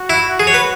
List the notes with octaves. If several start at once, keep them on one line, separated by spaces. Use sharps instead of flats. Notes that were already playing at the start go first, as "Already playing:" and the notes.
Already playing: F#4
E4
G#4
C#5
B4